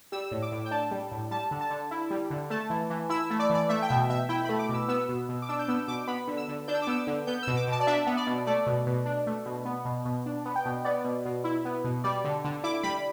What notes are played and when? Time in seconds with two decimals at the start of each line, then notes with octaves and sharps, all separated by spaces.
0.12 G3 E6
0.32 A2
0.42 D6
0.52 A2
0.65 G5
0.71 D4 A5
0.91 G3
1.12 A2
1.31 G3 A5
1.51 D3
1.61 A5
1.70 D3
1.91 E4
2.11 G3
2.30 D3
2.50 A3 A5
2.70 E3
2.90 E3
3.10 E4 E6
3.30 A3
3.39 D5
3.50 E3 D5
3.69 A3 E5
3.82 G5
3.89 B2 E5
4.09 B2 E5
4.29 E4 G5
4.45 A3 B5
4.59 D6
4.69 B2
4.74 E6
4.88 B3 E6
5.09 B2
5.29 B2
5.42 D6
5.49 D4 E6
5.59 G6
5.68 B3 E6
5.88 B2 D6
6.08 B3 B5
6.27 D3
6.37 E6
6.49 D3
6.68 D4 G6
6.75 E6
6.82 D6
6.87 B3 E6
7.07 D3
7.27 B3 G6
7.43 B2 E6
7.57 D6
7.68 B2 A5
7.80 D5
7.87 D4 E5
8.07 B3
8.17 D5
8.27 B2
8.47 A3 D5
8.66 B2
8.87 B2
9.06 D4
9.27 A3
9.46 B2
9.65 B3
9.85 B2
10.05 B2
10.26 D4
10.46 B3
10.56 G5
10.66 B2
10.85 B3 D5
11.04 B2
11.25 B2
11.44 E4
11.65 B3
11.84 B2
12.04 G3 D5
12.24 D3
12.45 D3
12.64 E4 D6
12.83 G3 B5